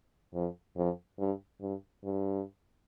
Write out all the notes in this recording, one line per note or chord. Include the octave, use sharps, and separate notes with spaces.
F2
F2
G2
G2
G2